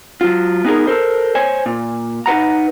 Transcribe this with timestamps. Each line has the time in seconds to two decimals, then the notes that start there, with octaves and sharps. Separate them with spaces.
0.21 F#3 F4
0.65 B3 D#4 G#4 A#4
0.87 A4 A#4 C5
1.35 C5 C#5 G#5
1.66 A#2
2.26 D#4 B4 F#5 A#5